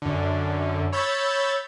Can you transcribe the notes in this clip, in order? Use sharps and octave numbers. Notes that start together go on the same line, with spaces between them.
F#2 D3
C#5 B5 E6 G6 A6